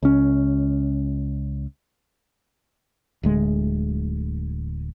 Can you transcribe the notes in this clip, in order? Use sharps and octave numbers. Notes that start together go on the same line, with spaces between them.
C#2 C#4
D1 D2 G#3